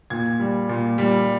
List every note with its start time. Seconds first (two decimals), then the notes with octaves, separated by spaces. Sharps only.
0.10 A#2 G#6
0.40 G3
0.69 A#2
0.98 G3